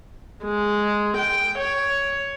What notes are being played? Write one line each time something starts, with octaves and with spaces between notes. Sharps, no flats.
G#3
G5
C#5